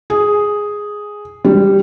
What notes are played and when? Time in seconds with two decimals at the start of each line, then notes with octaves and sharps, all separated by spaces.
0.10 G#4
1.45 G3